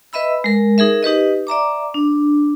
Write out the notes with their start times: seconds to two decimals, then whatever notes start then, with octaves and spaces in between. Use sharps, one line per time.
0.13 B4 D#5 E5 B5 E6
0.44 G#3 A#4
0.78 D#4 G#4 A#4 E5
1.03 D#4 G4 B4 D#5
1.47 D5 E5 A#5 D6
1.94 D4